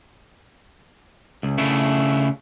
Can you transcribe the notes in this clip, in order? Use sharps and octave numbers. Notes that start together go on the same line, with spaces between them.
C#2
C#3 A3 D4 E4